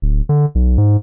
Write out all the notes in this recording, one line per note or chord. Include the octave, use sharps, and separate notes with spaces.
D1
D3
B1
G#2